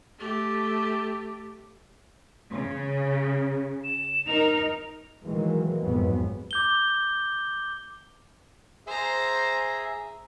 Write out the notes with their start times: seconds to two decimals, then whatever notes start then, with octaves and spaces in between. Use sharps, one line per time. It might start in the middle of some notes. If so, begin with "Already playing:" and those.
0.18 A3 G4
2.53 C#3
3.84 E7
4.27 D#4 A#4 F7
5.24 D#3 E3 F#3 G#3 A#3
5.82 G#1 F2 G#2 F#3 B3
6.51 D6 G6 G7
8.87 G#4 C5 E5 A#5